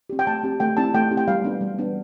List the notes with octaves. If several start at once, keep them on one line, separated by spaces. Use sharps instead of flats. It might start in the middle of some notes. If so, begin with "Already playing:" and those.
C4 G4
G5
A3 A5
C4 G4
A3 G5
C4 E4 G4 A5
A3 G5
C4 E4 G4
G5
G3 F5
B3 D4
G3
B3 D4